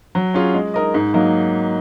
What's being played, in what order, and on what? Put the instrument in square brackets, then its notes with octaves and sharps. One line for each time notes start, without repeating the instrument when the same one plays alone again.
[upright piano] F#3
C#4 F4 G#4
G#3
D#4 A#4 D#5
G#2
F#3 A#3 D#4